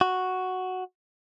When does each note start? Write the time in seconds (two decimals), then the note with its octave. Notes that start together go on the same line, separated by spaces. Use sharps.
0.01 F#4